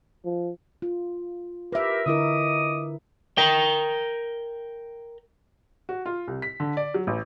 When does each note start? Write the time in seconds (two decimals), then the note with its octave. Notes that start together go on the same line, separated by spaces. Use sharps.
0.25 F3
0.82 F4
1.72 G4 A#4 B4 E5
2.06 D3 E4 A#4 D#5 D6 D#6
3.38 A#4 G5
5.89 F#4
6.06 F4
6.27 C2
6.42 B6
6.60 D3
6.77 D5
6.94 F#3
7.07 A1